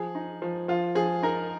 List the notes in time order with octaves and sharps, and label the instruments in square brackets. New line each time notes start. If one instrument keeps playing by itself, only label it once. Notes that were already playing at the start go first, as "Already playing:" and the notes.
Already playing: [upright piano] F3 G#4
D#4
F3
F3 F4
F3 G#4
D#4 A#4